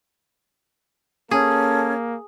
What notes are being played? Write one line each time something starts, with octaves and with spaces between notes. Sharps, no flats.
A#3 C#4 G#4 A4